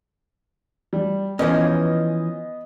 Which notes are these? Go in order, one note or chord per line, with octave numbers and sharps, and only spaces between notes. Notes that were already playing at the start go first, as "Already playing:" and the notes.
G3
E3 F3 B3 C#4 D#5